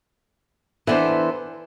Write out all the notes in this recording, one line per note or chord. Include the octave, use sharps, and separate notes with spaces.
E3 B3 D4 A4 C5